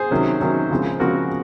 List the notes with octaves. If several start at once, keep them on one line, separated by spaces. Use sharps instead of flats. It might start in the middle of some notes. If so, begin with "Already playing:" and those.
Already playing: G#4 C5
C3 D#3 F#3 C#4
C3 D#3 F#3 C#4
C#3 F3 G#3 C4
C#3 F3 G#3 C4 F#4 A#4